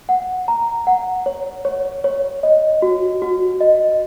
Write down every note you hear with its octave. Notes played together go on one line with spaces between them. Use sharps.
F#5
A#5
F#5
C#5
C#5
C#5
D#5
F#4
F#4
D#5